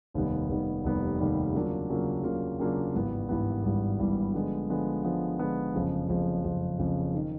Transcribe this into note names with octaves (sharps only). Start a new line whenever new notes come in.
F1 D#2 D#3 G3 B3
F1 D#2 D#3 G3 B3
F1 D#2 D#3 G3 B3
F1 D#2 D#3 G3 B3
C#3 F#3 A#3 D4 F4
C#3 F#3 A#3 D4 F4
C#3 F#3 A#3 D4 F4
C#3 F#3 A#3 D4 F4
G#1 G2 E3 G3 B3
G#1 G2 E3 G3 B3
G#1 G2 E3 G3 B3
G#1 G2 E3 G3 B3
D3 F3 G#3 B3
D3 F3 G#3 B3
D3 F3 G#3 B3
D3 F3 G#3 B3
F#1 F2 C#3 F3
F#1 F2 C#3 F3
F#1 F2 C#3 F3
F#1 F2 C#3 F3
D#3